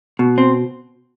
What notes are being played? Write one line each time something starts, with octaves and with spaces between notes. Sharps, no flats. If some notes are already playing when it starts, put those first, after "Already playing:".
B2
C4